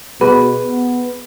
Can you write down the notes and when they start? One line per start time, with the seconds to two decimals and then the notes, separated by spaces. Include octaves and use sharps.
0.21 B2 G#4 B4
0.65 B3